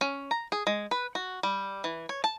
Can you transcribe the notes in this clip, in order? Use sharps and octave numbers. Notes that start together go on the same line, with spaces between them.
C#4
A#5
G#4
G#3
B4
F#4
G3
E3
C#5
A5